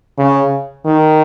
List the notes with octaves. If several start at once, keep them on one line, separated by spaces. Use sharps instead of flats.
C#3
D#3